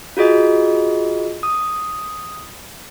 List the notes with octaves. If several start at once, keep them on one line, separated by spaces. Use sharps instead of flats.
F4 F#4 G#4 D#5
D#6